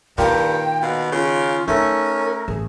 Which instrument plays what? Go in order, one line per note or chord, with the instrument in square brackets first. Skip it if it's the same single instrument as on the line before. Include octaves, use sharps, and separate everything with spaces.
[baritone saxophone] G2 [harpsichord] A#2 A#3 [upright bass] D#3 [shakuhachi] G5
[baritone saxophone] B2 [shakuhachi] F5
[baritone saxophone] C#3 [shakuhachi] F4
[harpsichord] A3 [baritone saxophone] C#4 [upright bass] D#4 [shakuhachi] A#4
[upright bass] A1 [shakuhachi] G#4